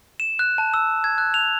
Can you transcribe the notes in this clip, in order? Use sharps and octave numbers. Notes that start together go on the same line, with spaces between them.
E7
F#6
A5
E6
G#6
F#6
F7